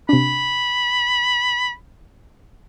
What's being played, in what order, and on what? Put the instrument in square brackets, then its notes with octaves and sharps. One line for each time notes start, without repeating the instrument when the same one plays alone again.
[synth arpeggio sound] C3 D4 [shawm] B5